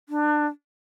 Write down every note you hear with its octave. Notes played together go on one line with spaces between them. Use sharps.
D4